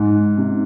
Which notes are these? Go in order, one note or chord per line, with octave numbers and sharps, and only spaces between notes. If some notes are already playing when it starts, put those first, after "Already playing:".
Already playing: G#2
C3